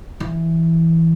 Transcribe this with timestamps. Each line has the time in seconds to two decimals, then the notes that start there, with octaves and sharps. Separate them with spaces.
0.20 E3